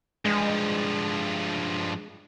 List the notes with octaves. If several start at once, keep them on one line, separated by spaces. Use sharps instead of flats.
G2 F3 G#3